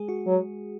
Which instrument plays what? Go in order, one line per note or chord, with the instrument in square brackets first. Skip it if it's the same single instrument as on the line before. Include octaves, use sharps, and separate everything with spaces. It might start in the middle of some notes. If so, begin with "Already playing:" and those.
Already playing: [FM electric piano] G#3 G#4
F#4
[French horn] F#3